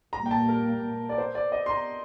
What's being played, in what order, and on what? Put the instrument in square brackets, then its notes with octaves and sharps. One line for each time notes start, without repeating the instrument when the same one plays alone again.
[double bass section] A#2 G3 A#3 [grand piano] A#5
[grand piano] G5
A5
A#4
D5
C5
D5
D#5
C6
A#5